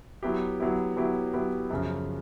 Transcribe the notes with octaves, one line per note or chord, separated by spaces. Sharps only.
F#3 B3 E4 G4
F#3 B3 E4 G4
F#3 B3 E4 G4
F#3 B3 E4 G4
F#2 C#3 F3